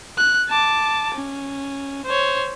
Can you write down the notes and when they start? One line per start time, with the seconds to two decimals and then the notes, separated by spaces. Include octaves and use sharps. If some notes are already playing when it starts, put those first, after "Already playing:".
0.18 F#6
0.49 A5 D6
1.15 C#4
2.05 C5 C#5